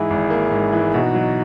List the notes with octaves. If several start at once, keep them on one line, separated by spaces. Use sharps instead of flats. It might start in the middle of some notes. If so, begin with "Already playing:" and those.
Already playing: G#2 E3 E4 G#4
G#1
A#3
G#2
E3
B2 D#4 F#4
F#3